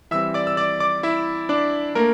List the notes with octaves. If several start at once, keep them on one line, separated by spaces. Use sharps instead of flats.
E3 G3 C4 E5 E6
D5 D6
E6
D5 D6
D5 D6
E4 E5
D4 D5
A3 A#3 D4 A#4